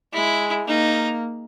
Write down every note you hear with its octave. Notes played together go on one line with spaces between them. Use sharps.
G#3 E4
A#3 D#4